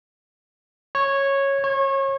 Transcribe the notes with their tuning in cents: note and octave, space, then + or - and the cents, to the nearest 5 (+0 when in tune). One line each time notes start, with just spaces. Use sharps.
C#5 -10
C#5 -30